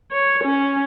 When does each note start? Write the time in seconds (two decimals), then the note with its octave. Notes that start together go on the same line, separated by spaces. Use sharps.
0.12 C#5
0.44 C#4